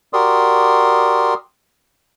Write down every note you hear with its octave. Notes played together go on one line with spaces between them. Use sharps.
F#4 G4 A#4 D5 C6 D#6